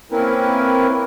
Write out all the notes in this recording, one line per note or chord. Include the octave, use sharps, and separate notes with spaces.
A#3 C4 C#4 E4 A#4 B4